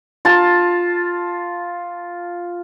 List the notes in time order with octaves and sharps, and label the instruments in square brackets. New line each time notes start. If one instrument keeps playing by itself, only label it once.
[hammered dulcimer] F4 A5